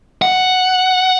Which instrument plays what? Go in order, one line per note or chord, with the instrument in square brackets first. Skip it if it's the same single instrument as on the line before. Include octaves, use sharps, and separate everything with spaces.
[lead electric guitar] F#5